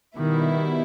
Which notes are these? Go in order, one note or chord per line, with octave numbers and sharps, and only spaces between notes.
B2 D#3 G3 B3 E4